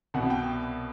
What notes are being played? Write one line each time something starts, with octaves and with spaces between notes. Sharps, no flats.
C2 B2 F#5
G5